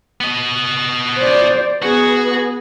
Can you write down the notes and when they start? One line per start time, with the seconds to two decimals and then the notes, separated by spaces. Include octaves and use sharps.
0.21 B3 D#5
1.19 C5 D5
1.83 B3 F#4 G#4